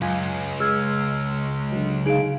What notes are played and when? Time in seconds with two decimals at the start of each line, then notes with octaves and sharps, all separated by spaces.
0.01 C#2 F#2 F4 G#5
0.60 G#3 E6 F6 G#6
1.72 D3 F#3
2.06 D#4 G#4 F5 D7